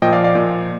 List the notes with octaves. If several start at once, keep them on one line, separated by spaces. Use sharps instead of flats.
A#2 F3 D#5 G5
D5 F5
D5 F5
A#2 F3